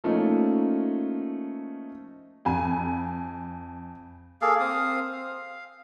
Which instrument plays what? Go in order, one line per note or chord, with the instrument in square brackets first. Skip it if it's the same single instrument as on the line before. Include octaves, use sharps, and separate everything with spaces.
[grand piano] F3 A3 A#3 C#4 D#4 F4
[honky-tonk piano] F2 G#5 D#7
[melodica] A#3 G#4 A4 F5
C4 F5 D#6
F5